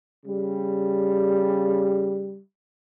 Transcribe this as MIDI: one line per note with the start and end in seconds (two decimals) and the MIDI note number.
0.26 2.39 49
0.26 2.39 55